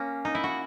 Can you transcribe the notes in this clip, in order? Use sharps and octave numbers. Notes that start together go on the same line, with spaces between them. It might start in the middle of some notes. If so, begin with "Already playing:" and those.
Already playing: A#3 C#4
D#4
E4
F#4